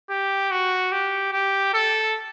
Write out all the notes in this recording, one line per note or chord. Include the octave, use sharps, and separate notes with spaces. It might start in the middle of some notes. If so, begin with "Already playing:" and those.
G4
F#4
G4
G4
A4